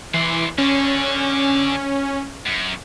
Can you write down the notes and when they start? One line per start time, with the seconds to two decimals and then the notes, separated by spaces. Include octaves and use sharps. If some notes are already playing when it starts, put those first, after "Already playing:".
0.14 E3 C5 D5
0.58 D3 C#4
2.47 F#2